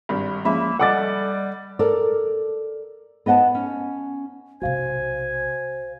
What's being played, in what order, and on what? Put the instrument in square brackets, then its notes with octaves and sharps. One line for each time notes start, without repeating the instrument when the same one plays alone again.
[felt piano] G#1 G2 [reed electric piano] B5
[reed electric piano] F3 G#3 C#4 [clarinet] A#3 [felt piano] E5 B5
[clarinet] G3 [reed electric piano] A4 D#5 [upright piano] F#5 D6 A6
[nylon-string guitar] A4 A#4 D5
B3 D#5 F#5 G5 A5
C#4
[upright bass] B1 C3 [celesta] F#4 F5 [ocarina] C5 [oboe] G#5